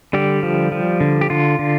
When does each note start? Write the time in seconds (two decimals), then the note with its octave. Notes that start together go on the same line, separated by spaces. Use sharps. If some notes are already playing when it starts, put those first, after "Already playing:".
0.13 D3 G3 G4
0.43 F3
0.72 F3
1.00 D3
1.21 G4
1.30 D3 F4
1.59 D3